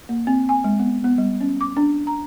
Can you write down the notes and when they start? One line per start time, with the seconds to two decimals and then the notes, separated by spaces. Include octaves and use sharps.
0.09 A#3
0.27 C4
0.49 G#5
0.64 G#3
0.80 B3
1.04 B3
1.18 G3
1.41 C#4
1.61 D6
1.77 D4
2.07 A#5